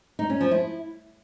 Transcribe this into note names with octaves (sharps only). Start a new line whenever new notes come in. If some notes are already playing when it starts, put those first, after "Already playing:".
D#4
C#4
F3
E4